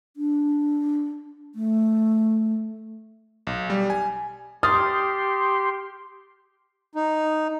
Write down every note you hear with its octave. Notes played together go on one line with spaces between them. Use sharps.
D4
A3
B1
G3
G#5
G4 C6 D#6 F6 A6
D#4